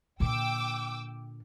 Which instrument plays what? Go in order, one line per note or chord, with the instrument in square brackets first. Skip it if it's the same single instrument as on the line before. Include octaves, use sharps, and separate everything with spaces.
[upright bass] A#2 D3 [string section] G5 D6 E6